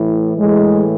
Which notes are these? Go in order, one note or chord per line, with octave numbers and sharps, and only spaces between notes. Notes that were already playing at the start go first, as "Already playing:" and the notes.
Already playing: A2 E3
A2 E3 G#3